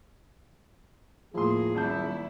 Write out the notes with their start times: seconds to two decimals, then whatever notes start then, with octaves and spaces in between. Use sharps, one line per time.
1.34 D#2 A2 F3 A#3 E4 G#4 C6
1.75 D#1 G#1 F#3 E4 A5 G6